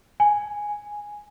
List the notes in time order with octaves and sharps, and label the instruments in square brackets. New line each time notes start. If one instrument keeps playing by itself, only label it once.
[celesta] G#5